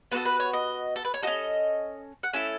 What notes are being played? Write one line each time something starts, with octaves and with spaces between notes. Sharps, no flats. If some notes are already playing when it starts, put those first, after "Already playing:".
B3 F#4 A4 B4
B4
C#5
D#5
A4
B4
C#5
C#4 F#4 A4 D#5
F#5
A3 C#4 E4 A4 E5